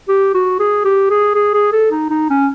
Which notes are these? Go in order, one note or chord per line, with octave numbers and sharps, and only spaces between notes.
G4
F#4
G#4
G4
G#4
G#4
G#4
A4
D#4
D#4
C#4